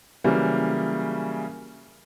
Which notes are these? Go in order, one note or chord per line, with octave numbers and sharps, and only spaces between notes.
C#3 E3 F#3 G3 A#3